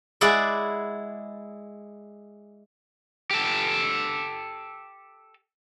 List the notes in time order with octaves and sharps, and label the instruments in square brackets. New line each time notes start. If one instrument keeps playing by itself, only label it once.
[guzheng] G#3 E4 G#4 D5 F#5
[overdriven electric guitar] G4 A4